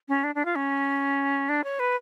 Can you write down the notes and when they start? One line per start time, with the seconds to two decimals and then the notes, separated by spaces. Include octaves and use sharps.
0.09 C#4
0.24 D4
0.35 D4
0.45 F4
0.56 C#4
1.49 D4
1.64 C#5
1.79 B4